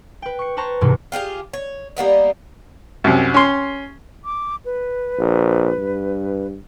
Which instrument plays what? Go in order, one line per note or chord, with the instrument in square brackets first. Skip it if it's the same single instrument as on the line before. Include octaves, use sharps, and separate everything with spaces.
[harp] B4 G5
C#6 C#7
B4 C5 A5 A#5 C#6
E1 D#2 G#2 C3 F#4
[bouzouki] F4 G4 G#4 F5
C#5
G3 A#3 B3 D#4
[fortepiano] C2 F#2
C#4 C6
[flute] D6
B4
[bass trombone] A#1
G2